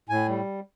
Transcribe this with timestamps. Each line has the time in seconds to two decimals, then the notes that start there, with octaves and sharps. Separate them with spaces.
0.09 A2 G#5
0.28 G3